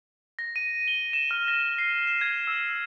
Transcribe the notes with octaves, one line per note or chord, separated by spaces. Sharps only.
A#6
D#7
G7
E7
F6
A#6
C7
E7
G#6
E6